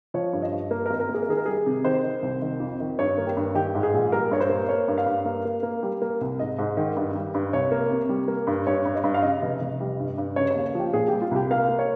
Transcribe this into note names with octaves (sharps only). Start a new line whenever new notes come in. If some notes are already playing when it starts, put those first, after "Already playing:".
F3 C#5
G2
D#5
G2
A#3
G#1 A#4
A#4
A#3
G#4
A#4
D#3 G#4
A#4
G3 G#4
C3
D#3 C5
D#3
C2
D#3
F2
D#3
G2 C#5
A#3
G4
G2
D#3 G4
G#2
G#4
A#1
G3 A#4
G2 C#5
C5
A#3
A#3 C#5
G2
F5
G2
A#3
A#3
A#3
G3
A#3
C2
G#2 D#5
G#2
D#3
G2
G3
G2
C2 C#5
A#3
C3
G3
A#3
G2
G2 C#5
G2
D#5
G2
F5
C#3 D#5
F1
F1
G3
G2
G2
C#3 C#5
C#5
D#2
F3 G4
A#2 G#4
G3 G4
F4
C2 G4
A#3 F5
A#3
C#5